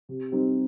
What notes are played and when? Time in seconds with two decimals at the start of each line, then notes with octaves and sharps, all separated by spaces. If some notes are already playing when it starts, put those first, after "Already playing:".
0.09 C3
0.32 G3 C4 D#4